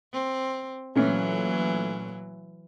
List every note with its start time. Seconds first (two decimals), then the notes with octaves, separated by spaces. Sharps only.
0.13 C4
0.95 A#2 E3 F#3 A3 C#4